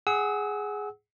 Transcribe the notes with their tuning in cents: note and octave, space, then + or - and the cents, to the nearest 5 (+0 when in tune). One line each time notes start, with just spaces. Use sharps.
G#4 +0 F#5 +10 E6 -35